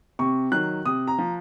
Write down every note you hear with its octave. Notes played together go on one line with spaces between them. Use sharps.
C3 C#6
D#3 F#3 F#6
C3 D#6
A#5
F3